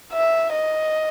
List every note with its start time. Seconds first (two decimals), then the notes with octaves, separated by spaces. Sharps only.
0.13 E5
0.53 D#5